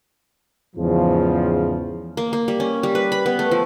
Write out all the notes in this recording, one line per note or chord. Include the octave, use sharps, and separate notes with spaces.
E2 G#2 C#3 F3
A#3
A#3
G3
C#4
G3
B4
B5
B3
A3
F3